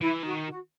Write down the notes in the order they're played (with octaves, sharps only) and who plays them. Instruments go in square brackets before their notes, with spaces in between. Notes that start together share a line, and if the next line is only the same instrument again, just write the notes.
[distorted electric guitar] E3 [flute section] E4
[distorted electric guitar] D#3 [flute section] F#4
[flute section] F#4